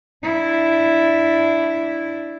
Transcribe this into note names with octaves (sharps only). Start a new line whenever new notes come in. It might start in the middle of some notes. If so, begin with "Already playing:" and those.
D4 E4